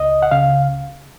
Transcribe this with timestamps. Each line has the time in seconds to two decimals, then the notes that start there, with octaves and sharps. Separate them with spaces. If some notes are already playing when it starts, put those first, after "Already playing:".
Already playing: C#2 D#5
0.22 F#5
0.31 C#3 F5